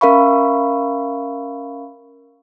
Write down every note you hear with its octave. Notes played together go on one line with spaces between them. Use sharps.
C#4 A#4 E5 F5 B5 C#6